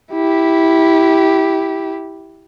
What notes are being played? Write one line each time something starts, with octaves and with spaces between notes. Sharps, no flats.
E4 G4